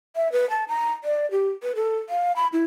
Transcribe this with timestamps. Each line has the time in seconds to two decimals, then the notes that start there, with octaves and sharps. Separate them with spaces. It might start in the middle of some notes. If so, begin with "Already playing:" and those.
0.16 E5
0.32 B4
0.50 A5
0.68 A#5
1.04 D5
1.31 G4
1.63 B4
1.76 A4
2.10 F5
2.36 B5
2.53 E4